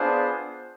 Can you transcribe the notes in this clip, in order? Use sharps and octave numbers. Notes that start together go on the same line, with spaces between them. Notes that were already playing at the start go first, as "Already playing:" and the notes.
Already playing: B3 D4 F4 G#4 C5